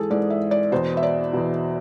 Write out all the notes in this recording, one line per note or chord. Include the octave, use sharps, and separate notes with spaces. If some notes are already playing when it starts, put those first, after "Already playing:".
Already playing: G#2 E3 G#4 A4
G#2 E3 D5
E5
D5
E2 B2 C5
E5
D5
E2 B2